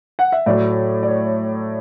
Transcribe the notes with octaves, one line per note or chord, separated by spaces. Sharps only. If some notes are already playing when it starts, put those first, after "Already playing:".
F#5
E5
A2 F#3 A3 D5
D5
C#5